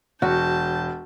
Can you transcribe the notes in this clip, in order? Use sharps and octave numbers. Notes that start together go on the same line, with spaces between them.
E1 F#4 A5 G6